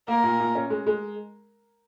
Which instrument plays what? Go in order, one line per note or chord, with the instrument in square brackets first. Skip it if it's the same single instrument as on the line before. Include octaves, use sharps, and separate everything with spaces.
[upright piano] A#3 [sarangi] A#4
[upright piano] A#2
A#2
C#4
G#3
G#3